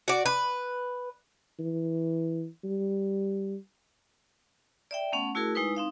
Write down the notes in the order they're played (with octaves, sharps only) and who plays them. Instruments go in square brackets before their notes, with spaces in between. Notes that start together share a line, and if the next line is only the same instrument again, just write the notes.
[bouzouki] F#4 D5
B4
[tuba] E3
G3
[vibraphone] D5 E5 G5
A3 B3 C#4 F#5
A3 E4 F#4 G#4 A#4
G#3 D#4 E4 B4 D#6
C4 D#4 F5 D#6